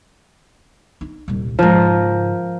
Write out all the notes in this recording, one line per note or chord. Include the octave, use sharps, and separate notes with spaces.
D#4
D#1 C2
G#2 C#3 F3 A#4